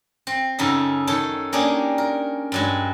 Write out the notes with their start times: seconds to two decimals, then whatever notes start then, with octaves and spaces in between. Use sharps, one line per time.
0.27 C4
0.59 F#2 C#3 D#4 A4 E5
1.07 D#3 A4 C#5 A5
1.53 A#3 C#4 D4 G4 G#4
1.98 A#4
2.52 G2 F#3 G#3